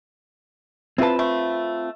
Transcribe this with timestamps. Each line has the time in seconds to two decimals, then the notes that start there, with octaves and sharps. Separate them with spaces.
0.98 C4 E4 F4 B4 A5
1.19 A3